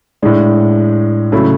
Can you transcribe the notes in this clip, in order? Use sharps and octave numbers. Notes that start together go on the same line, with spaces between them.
A2 G#3 D4
C#3 F#3 A3 E4